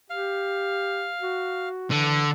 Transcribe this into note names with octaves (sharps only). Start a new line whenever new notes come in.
G4 F5
F#4
D3 E3